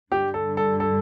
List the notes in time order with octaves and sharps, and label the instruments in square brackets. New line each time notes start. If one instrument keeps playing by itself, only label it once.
[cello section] G2 D3 G3 [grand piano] G4
[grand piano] A4
A4
A4